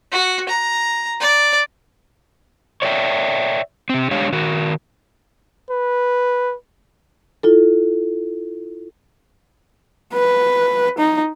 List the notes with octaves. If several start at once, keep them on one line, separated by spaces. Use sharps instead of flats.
F#4
A#5
D5
C#5 D5 E5 G5
C3 C4
G#3 D4 G4 C#5 F5
D#3 F#4 A#4
B4
E4 F4 A4
B4
D#4